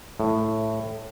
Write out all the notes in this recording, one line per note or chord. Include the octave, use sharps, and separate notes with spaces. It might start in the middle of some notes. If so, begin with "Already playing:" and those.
A2